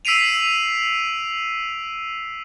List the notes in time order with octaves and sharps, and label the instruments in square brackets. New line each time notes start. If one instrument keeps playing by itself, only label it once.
[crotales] E6 B6 C7 D7 D#7 F7